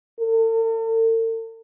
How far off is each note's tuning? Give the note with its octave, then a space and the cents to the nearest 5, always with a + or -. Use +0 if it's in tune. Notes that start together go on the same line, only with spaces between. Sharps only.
A4 +45